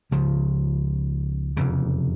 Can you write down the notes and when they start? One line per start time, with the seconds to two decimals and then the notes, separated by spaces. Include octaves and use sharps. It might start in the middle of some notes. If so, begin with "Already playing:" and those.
0.11 C#2 C#3 F3
1.57 F1 E2 C#3